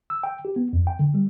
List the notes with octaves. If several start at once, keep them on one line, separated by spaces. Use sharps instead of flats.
E6
G5
G4
B3
F2
G5
D3
G3